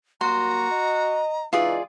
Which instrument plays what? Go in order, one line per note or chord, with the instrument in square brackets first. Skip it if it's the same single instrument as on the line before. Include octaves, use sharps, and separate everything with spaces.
[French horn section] F#3 G3 A#3 [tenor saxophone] F#4 [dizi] A#5 [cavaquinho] C6
[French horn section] D#5
[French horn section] C#3 G#3 D#4 [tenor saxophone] E3 [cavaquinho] F4 G#4 D5